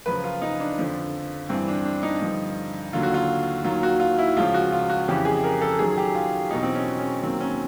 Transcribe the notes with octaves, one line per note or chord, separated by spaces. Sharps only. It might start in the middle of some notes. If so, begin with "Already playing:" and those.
F#2 C#3 F3 B4
F4
D#4
D4
F2 D3 F3
G2 E3 C4
D4
D4
D#4
G2 D3 F3
D#2 D3 F#3 F4
F#4
F4
D#2 D#3 F#3 F4
F#4
F4
E4
C#2 C#3 F3 F4
F#4
F4
F#4
F2 C#3 E3 G4
G#4
A#4
A4
F#2 D#3 F#3 G#4
G4
F4
E2 B2 F#3 D#4
C4
C#4
C#4
D#2 D#3 F#3 C4
C#4